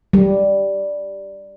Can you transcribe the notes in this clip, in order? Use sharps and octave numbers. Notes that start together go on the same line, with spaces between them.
G3